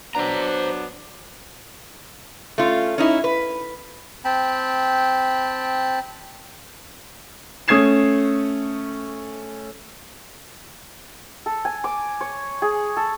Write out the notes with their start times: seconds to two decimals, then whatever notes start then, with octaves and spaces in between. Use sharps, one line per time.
0.15 F#3 B3 D4 C5 A#5
2.58 A3 C#4 F4
2.98 C#4 D#4 E4
3.24 B4
4.25 C4 G5 A5 B5
7.68 A3 C#4 D#6 G#6 C7 E7
11.46 A4
11.65 G#5
11.84 D6
12.21 C#5
12.62 G#4
12.97 A4